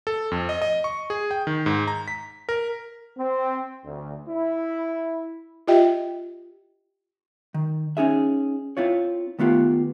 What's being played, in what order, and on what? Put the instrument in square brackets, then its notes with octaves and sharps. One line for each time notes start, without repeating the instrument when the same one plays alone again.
[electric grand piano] A4
F2
D#5
D#5
C#6
G#4
G5
D#3
G#2
A#5
B6
A#4
[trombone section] C4
D2
E4
[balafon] F4 G4 D#5 E5 G5
[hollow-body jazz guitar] D#3
C#4 D#4 G#4 E5
C4 E4 F4 C#5
D#3 A3 B3 F4 G4